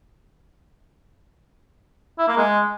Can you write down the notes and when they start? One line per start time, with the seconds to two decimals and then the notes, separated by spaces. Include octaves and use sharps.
2.19 E4
2.28 A#3
2.37 G#3